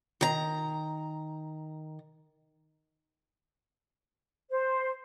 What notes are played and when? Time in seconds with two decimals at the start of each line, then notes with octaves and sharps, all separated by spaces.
0.21 D#3 A#5
4.50 C5